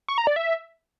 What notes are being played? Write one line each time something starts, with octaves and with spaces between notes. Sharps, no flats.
C#6
A#5
D5
E5